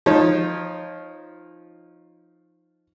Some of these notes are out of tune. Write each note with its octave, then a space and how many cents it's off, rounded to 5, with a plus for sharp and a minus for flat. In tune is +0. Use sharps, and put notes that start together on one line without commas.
F3 +0 D#4 +0 C#5 -25